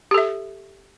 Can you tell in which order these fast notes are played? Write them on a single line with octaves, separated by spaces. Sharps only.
G4 A4 E5